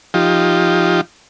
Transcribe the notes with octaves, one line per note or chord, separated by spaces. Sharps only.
F3 D#4 F4 G4